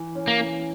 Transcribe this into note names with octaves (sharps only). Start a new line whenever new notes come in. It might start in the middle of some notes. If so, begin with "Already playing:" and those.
Already playing: E3
C#4
A#3
E3